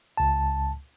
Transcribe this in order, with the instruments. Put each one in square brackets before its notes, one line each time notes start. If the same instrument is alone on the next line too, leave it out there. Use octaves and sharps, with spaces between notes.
[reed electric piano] C#2 A5